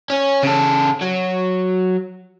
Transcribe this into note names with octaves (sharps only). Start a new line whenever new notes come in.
C#4
C#3 A4
F#3